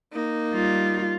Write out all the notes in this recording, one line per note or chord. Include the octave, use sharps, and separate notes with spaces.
A#3 D#4
G3 F4